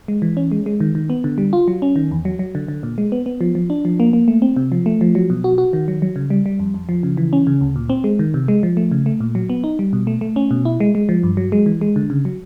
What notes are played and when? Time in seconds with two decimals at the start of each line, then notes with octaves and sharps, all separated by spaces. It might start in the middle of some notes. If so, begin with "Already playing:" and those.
0.08 G#3
0.22 E3
0.37 C#4
0.52 G#3
0.66 G#3
0.80 D#3
0.95 D#3
1.10 B3
1.24 D3
1.38 G3
1.53 F4
1.68 F#3
1.82 C#4
1.96 D#3
2.11 E2
2.25 F#3
2.39 F#3
2.55 D3
2.68 D3
2.83 A#2
2.98 G#3
3.12 B3
3.26 B3
3.41 F3
3.55 F3
3.70 D4
3.85 F3
4.00 A#3
4.13 A#3
4.28 A3
4.42 C4
4.56 C3
4.72 F3
4.86 A3
5.01 F3
5.15 F#3
5.30 B2
5.44 F#4
5.58 F#4
5.73 D#3
5.88 F#3
6.02 F#3
6.16 C#3
6.30 G3
6.46 G3
6.59 F2
6.74 F2
6.89 F3
7.03 C#3
7.17 E3
7.33 C#4
7.47 C#3
7.61 D2
7.76 A#2
7.90 C4
8.04 G#3
8.19 D#3
8.34 C3
8.48 G#3
8.63 F3
8.77 A3
8.91 C#3
9.06 A3
9.20 A#2
9.35 F#3
9.50 B3
9.64 D#4
9.79 G3
9.93 B2
10.07 A3
10.21 A3
10.36 C#4
10.51 B2
10.65 E4
10.80 G#3
10.95 G#3
11.09 F3
11.23 G2
11.37 F#3
11.52 G#3
11.66 E3
11.81 G#3
11.96 D3
12.10 C#3
12.25 F#3